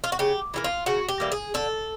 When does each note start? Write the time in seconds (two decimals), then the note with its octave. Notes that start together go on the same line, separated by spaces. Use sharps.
0.04 F4
0.12 F#4
0.19 C#3 G4
0.54 E3 G3 A#3
0.64 F4
0.86 C#3 F#4
1.08 G4
1.20 E3 G3 A#3
1.32 G#4
1.54 D3 A4